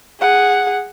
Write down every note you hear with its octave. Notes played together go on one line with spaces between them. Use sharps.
G#4 F#5